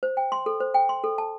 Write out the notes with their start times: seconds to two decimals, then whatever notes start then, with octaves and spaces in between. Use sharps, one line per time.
0.03 C5
0.17 G5
0.32 C6
0.46 A4
0.60 C5
0.74 G5
0.89 C6
1.04 A4
1.18 A5